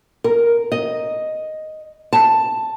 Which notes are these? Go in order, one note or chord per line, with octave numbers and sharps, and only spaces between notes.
A#4
D#5
A5